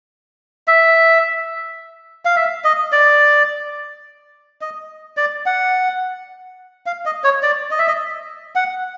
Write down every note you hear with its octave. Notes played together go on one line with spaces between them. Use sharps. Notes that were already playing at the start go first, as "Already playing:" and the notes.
E5
F5
E5
D#5
D5
D#5
D5
F#5
F5
D#5
C#5
D5
D#5
E5
D#5
F#5